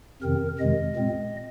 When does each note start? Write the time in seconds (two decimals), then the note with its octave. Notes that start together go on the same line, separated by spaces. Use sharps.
0.22 F2 C3 D#3 C4 A#4
0.59 F2 C3 D#3 G#3 D#5
0.96 A#2 G#3 C4